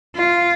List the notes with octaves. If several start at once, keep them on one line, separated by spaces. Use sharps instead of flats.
F4